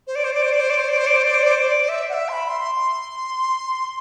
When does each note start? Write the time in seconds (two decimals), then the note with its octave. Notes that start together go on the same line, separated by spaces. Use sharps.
0.07 C5
0.16 D5
0.24 C5
0.34 D5
0.42 C5
0.52 D5
0.61 C5
0.70 D5
0.79 C5
0.89 D5
0.98 C5
1.07 D5
1.16 C5
1.25 D5
1.35 C5
1.43 D5
1.52 C5
1.68 D5
1.89 E5
2.09 F#5
2.14 E5
2.29 C6
2.33 B5
2.49 C6